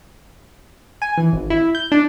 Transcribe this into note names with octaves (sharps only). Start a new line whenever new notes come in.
G#5
E3
G#1
E4
G6
D4